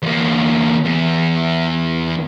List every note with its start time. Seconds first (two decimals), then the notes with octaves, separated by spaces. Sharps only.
0.03 E2 A#3
0.85 E2